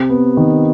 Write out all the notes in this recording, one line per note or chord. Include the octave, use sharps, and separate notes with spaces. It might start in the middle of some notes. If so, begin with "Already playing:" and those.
Already playing: C3
B3
D#3